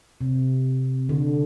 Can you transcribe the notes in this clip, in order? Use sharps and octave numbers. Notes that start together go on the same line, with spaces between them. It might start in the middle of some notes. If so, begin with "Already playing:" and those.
C3
D3